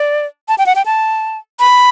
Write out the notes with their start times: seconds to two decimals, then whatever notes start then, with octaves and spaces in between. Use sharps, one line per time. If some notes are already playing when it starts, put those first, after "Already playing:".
Already playing: D5
0.48 A5
0.58 G5
0.66 F#5
0.76 G5
0.86 A5
1.60 B5